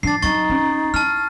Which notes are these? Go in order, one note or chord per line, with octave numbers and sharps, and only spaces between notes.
F3 D4 A6 C7
F#3 D4 D#4 C#6 A6
C#4
E4 A5 F6